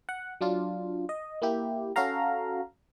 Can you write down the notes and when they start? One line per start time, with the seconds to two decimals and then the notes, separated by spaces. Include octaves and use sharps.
0.09 F#5
0.41 F#3 D4 F4
1.09 D#5
1.42 A#3 E4 G4
1.96 C#4 F#4 A4 F5 A#5